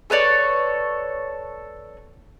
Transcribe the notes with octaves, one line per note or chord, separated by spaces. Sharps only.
A4 B4 C#5 D5